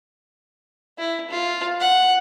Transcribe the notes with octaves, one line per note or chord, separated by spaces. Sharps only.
E4
F4
F#5